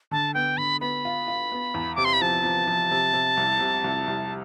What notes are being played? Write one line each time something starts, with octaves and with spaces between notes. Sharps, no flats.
D3 A5
B3 G5
D3 B5
B3 B5
F4
F4
B3
E2
C3 D6
C6
B5
F3 A5
F3
F3
C3
C3
C2
C3
C2
C2